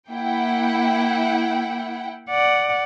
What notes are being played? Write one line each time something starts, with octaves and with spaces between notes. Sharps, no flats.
A#3 E4 F#5 G5
D5 F#5